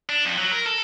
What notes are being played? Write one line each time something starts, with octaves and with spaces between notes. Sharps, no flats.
D4
F2
F#3
A#4
A4